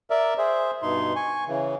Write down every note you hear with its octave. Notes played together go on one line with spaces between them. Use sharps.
A#4 D5 E5
G#4 C5 E5
G2 B2 D#4 C6
G#5 C#6
C#3 E3